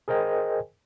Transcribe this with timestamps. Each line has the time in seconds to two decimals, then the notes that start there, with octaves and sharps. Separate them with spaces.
0.08 G#4 A#4 C5 D#5 G5 G#5